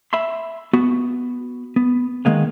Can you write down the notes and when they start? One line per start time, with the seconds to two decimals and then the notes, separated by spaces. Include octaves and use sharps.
0.13 E5 B5 C6
0.73 B3 F#4
1.76 B3
2.25 D#3 G#3 A#3 B3